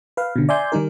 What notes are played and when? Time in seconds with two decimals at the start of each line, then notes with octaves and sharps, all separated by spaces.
0.17 B4 F5
0.36 B2 D3
0.49 D5 E5 G#5 C6 G6
0.72 D#3 G3 D#4 A#4